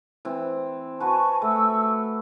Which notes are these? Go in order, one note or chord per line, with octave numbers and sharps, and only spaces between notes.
E3 C4
F#4 B4 G#5 A5 C#6
A3 C#6 E6